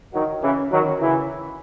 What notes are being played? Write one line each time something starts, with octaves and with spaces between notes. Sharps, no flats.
D#3 F#3
C#3 E3
D#3 F#3
C#3 E3